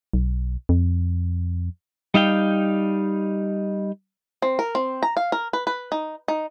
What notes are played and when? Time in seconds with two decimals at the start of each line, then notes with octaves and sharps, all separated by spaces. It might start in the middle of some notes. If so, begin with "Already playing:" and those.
0.13 B1
0.69 F2
2.14 G3 D#4 F5 G5
4.42 C4
4.59 A#4
4.75 C4
5.03 A#5
5.17 F5
5.32 A#4
5.53 B4
5.67 B4
5.92 D#4
6.28 D#4